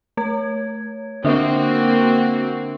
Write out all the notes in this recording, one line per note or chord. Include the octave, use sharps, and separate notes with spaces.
A3 C#5 G#6
D3 A#3 C4 D4 F#4 E5